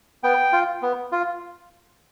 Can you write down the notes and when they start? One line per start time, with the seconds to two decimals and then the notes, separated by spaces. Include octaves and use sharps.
0.24 B3 G5
0.53 F4
0.82 B3
1.12 F4